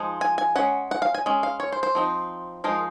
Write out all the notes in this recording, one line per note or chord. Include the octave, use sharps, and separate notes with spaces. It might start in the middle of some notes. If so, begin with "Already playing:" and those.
Already playing: F3 G#3 D#4
G#5
G#5
G#3 C#4 F#5
F#5
F5
G#5
G#3 C#4
F5
C#5
C5
C5
F3 C4 D#4
F3 G#3 D#4 A#4